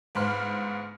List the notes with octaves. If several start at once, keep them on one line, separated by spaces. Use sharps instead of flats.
G1 G#2 C5 B5 F6